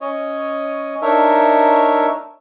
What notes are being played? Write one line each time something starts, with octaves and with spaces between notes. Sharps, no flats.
C#4 C#5 D#5
D4 D#4 A#4 C#5 E5